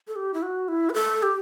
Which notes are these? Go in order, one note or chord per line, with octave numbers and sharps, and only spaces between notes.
A4
G4
E4
F#4
E4
B4
A4
G4